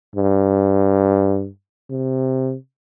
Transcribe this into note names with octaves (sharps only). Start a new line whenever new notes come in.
G2
C3